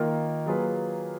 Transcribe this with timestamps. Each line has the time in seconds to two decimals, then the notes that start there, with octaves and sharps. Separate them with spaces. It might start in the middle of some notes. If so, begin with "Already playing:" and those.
Already playing: D#3 A#3 F4 A#4
0.46 F#3 A#3 F4 G#4 B4